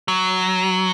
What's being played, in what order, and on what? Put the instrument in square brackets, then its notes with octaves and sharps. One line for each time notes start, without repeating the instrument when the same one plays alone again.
[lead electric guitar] F#3